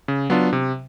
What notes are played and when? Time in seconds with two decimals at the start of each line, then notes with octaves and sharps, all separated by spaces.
0.08 C#3
0.30 F#3 B3 D4 F4
0.53 C3